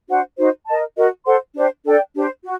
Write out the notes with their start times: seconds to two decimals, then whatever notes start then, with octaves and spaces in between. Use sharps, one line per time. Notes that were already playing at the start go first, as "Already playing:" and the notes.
0.08 D4 F#4 C5 F#5
0.37 D#4 F#4 C5
0.67 A#4 D#5 A5
0.96 F#4 A#4 D#5
1.25 A4 C5 F#5 C6
1.55 D4 G4 C5
1.84 D4 A4 D5 G5
2.15 D4 G4 C5
2.43 F#4